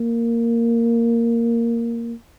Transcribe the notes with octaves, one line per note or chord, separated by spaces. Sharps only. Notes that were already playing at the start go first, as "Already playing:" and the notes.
Already playing: A#3